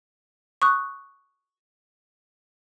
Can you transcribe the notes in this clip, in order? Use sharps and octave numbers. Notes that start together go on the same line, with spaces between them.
C#6 D#6 F#6